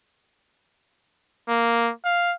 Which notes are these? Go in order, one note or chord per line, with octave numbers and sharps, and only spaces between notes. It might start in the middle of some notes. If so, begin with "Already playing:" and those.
A#3
F5